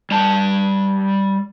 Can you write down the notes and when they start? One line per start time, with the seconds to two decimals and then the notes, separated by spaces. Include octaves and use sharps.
0.11 G3 A5